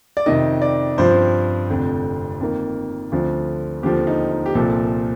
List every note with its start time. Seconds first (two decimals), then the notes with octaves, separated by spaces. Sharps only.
0.17 D5
0.26 F2 C3 D#3 D#5
0.62 D5
0.98 G2 F3 C4 C5
1.70 F1 F2 D3
2.40 F2 D#3 A#3
3.12 D2 D3 F3 C4
3.83 D#2 D3 F3 C4 G4
4.07 D#4
4.31 D#4
4.46 G4
4.55 C2 A#2 F3 A4